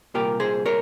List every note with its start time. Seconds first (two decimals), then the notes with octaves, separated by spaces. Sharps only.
0.14 C2 A#2 G4 A#4
0.40 G#4 C5
0.66 A#4 C#5